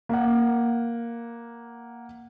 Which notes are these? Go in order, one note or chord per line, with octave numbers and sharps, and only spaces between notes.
A#3 F#5